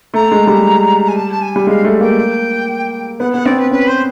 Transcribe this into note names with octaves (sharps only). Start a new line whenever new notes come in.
A3 A#5
G#3
G3
G#5
A5
A5
G#5
G3
G#3 F5
A3
A#3 G5
B3 F#5
B3 F#5
C4 D5
B4
C#4 B4
C5